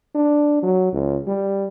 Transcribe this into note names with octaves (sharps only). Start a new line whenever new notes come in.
D4
F#3
C#2
G3